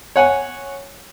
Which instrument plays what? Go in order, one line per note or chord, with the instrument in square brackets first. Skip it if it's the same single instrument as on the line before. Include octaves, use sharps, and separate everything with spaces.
[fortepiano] C#5 F#5 G#5